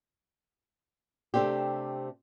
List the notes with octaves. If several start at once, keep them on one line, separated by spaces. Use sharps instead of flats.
C3 A3 C4 D4 G4